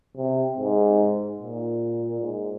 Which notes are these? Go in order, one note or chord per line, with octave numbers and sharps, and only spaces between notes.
C3
G#2
A#2
G#2